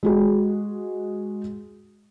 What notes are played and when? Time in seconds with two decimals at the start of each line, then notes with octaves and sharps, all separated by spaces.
0.03 G#3 F#4 G#4